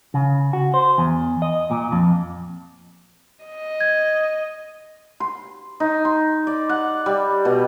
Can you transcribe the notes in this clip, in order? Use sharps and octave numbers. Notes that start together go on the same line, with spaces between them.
C#3
F#4
C5
E2
D#5
A#2
F2
D#5
G#6
C6
D#4
C6
D5
F#5
G3
B2